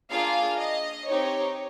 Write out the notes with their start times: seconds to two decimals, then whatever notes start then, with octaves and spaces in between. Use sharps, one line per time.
0.11 A#3 D4 F4 G#4 F5
0.59 D#5
1.08 C4 D#4 G4 C#5